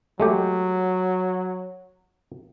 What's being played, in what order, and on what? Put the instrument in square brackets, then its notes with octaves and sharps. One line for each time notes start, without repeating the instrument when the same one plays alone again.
[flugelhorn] F#3 [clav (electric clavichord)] G#3 A3 G4